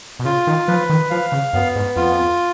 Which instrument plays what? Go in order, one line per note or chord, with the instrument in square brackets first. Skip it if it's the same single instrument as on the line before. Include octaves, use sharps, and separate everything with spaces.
[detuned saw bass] B2
[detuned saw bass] C#3 [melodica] F4
[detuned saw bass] D#3
[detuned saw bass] F3 [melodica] B4
[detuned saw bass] D#3
[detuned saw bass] F3 [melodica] F5
[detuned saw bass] C#3
[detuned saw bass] F#2 [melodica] B3
[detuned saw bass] G#2
[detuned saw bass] F2 [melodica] F4